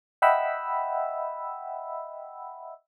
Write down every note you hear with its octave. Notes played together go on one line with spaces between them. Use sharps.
D#5 E5 F#5 G5 B5 E6